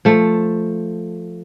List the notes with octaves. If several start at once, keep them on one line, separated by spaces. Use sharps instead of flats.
F3 A3